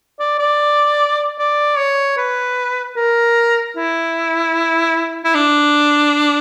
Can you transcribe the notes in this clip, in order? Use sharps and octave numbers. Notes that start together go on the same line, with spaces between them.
D5
D5
D5
C#5
B4
A#4
E4
E4
D4